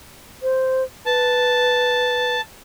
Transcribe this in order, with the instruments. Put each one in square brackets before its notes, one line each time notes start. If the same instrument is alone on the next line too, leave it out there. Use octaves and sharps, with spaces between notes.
[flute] C5
[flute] B4 [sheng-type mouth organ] A5